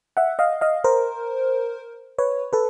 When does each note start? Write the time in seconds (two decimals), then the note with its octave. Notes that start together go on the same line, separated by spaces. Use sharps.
0.17 E5 F#5
0.39 D#5 F5
0.61 D#5 F5
0.84 A#4 C5
2.18 B4 C#5
2.53 A4 B4